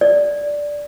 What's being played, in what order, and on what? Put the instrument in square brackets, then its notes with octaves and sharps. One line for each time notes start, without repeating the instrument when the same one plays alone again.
[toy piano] D5